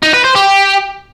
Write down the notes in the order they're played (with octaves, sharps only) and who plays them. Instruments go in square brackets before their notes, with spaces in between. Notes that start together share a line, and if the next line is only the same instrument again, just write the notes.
[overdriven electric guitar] D#4
B4
C5
G4